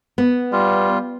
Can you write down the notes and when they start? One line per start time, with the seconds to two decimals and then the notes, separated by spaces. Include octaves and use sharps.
0.18 B3
0.53 G3 F4